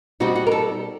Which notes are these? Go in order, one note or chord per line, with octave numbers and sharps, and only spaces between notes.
B2 G3 C4 D#4 F#4
F#4
A#4
A4